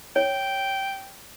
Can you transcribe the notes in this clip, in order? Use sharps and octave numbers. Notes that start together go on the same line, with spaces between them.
C#5 G5